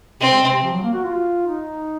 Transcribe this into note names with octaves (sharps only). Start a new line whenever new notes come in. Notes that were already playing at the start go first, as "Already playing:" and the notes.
C3 C4
G#3
C3
C3
F3
F#3
A#3
F#4
F4
D#4